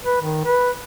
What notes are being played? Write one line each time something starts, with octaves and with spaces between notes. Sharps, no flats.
B4
D#3
B4